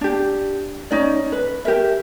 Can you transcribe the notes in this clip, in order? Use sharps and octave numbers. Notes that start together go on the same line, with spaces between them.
D4 G4
C#4 D#4 D5
B4
G4 A#4 E5